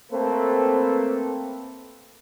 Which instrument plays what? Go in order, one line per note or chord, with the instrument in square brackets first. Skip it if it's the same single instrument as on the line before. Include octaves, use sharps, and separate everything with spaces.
[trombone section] A3 A#3 C4 A4 B4 C5